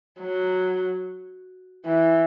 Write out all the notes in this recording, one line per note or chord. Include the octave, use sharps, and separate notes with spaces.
F#3
E3